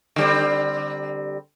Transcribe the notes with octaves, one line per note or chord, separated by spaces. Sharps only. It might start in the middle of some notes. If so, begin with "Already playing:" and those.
D3 G3 C4